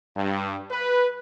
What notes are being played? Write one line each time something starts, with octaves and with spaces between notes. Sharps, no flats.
G2
B4